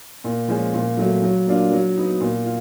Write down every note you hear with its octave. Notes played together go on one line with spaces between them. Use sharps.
A#2
F3 G#3 C#4
A#2
F#3 A3
F#3
A#3 D4 F4
F#3
B3 D#4
A#2
F4